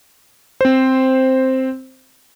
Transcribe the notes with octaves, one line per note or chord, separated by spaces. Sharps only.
C4 C5